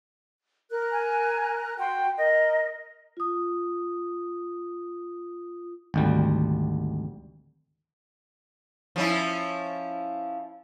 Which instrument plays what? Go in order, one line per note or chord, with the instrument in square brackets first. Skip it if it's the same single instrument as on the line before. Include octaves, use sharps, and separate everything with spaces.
[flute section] A#4 F#6
[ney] G#5
[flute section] F#4 C6 [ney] G5
[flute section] A#4 [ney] D#5
[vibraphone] F4 D#6
[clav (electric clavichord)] G#1 D2 G3
[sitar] F3 C#4 E4